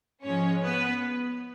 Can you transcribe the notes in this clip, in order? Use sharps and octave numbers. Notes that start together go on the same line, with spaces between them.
G#2 F3 G#3 C#4 C#5
B3 B4